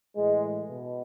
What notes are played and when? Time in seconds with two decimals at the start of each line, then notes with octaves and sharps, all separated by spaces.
0.16 A2 E3 G#3
0.70 B2